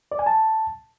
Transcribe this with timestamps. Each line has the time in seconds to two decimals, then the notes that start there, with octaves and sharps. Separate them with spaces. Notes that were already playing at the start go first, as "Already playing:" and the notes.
0.12 D5
0.19 G#5
0.26 A5